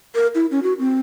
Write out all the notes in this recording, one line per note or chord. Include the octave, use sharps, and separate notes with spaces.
A#4
E4
C#4
F#4
C4